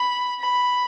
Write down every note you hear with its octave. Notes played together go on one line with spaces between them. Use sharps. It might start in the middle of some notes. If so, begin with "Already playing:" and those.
Already playing: B5
B5